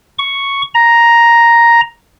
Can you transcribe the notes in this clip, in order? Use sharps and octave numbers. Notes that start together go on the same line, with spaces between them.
C#6
A#5